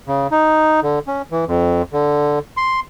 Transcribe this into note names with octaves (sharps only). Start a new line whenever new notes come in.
C#3
D#4
D3
C#4
E3
F2
D3
C6